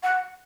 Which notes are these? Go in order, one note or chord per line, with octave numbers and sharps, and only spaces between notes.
F#5